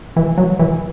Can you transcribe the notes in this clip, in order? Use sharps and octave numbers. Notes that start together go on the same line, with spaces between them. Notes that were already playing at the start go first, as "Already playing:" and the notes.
E3
F#3
E3